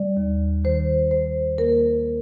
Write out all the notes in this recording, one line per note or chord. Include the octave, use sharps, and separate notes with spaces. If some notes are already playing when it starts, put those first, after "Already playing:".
Already playing: G3 D5
D#2
D#3 C5
D#2 C5
A#3 A#4